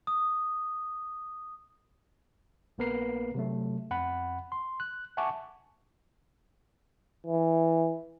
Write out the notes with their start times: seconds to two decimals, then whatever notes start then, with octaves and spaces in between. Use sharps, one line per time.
0.07 D#6
2.78 A#1 A#3 B3 A#4 B4 C7
3.35 C3 F#3 A3
3.91 F2 F#5 B5
4.52 C6
4.80 F#6
5.17 E5 F#5 G#5 A5 C#6 D6
7.27 E3